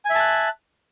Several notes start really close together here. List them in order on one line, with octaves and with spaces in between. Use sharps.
G#5 E5 A5 F#6